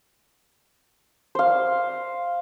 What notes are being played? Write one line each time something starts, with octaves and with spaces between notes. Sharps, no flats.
C5 F5